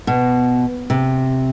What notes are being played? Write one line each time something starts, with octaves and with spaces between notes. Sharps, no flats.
B2
C3